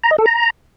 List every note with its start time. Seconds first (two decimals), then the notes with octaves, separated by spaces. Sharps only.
0.03 A#5
0.11 D#5
0.18 A4
0.26 A#5